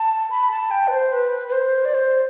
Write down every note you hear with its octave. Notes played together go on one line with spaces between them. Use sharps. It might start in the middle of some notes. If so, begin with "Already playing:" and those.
Already playing: A5
B5
A5
G5
B4
C5
B4
B4
C5
D5
C5